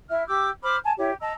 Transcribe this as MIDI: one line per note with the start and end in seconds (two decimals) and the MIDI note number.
0.09 0.23 64
0.09 0.23 76
0.09 0.23 89
0.26 0.49 67
0.26 0.49 86
0.26 0.49 88
0.26 0.49 91
0.63 0.76 72
0.63 0.76 83
0.63 0.76 86
0.63 0.76 89
0.84 0.92 80
0.84 0.92 81
0.97 1.11 64
0.97 1.11 67
0.97 1.11 73
1.20 1.32 75
1.20 1.32 81
1.20 1.32 82
1.20 1.32 88